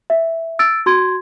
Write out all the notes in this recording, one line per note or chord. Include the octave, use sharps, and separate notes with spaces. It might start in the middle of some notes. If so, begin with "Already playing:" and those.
E5
E6 A6 D7
F#4 C6 G#6